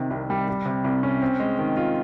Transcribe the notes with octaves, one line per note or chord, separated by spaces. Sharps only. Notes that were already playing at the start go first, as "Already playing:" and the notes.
Already playing: C3 D#3
C2
G3
G3
C3
C2
C#4
C4
G#3
D#3
F4